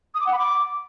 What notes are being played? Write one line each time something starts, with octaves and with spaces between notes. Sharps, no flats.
D#6
D6
F#5
B5
D6